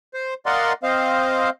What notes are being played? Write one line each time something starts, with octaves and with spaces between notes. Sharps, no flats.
C5
A#4 D5 D#5 F5 F#5 C6
C4 C5 D#5 F5